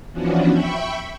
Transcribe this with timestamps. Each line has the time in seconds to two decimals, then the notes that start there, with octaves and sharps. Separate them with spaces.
0.13 E3 F3 B3 C#4 D4 F#4
0.48 E5 G5 B5 C#6